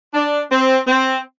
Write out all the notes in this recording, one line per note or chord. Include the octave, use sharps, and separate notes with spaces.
D4
C4
C4